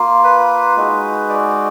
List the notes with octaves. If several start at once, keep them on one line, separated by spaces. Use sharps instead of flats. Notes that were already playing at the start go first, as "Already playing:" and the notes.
Already playing: A#3 F4
B4
G#3 D#4 F#4
D5